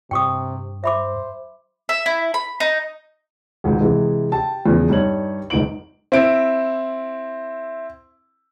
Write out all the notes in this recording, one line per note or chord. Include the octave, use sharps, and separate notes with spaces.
G2 C3 G5 C#6 D#6
C5 E5 B5 D6
E5
E4
B5
D#4
G#1 C#2 G#2
C3 E3 G#3
G4 A5
E2 C#3 F3
G2 G3 D#4 C#5 F#7
G1 C#2 D#4 D7 F#7
C4 E4 D7